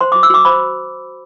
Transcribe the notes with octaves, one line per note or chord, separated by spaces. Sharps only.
C5 C6
F#4 D6
E6
F#4 D6
C5 B5